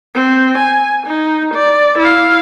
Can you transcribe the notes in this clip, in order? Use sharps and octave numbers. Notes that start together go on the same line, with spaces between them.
C4
G#5
D#4
D5
E4 F5